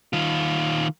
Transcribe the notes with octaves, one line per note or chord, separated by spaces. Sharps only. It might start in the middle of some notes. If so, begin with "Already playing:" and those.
D#3 F4